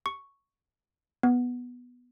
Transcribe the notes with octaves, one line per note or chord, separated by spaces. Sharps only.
C#6
B3